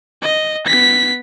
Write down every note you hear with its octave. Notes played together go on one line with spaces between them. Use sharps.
D#5
B3 B6